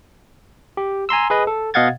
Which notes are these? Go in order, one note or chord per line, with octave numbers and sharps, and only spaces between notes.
G4
G#5 A#5 C6 E6
G#4 B4 D#5
A4
B2 D#5 F5 F#5 G#6 A6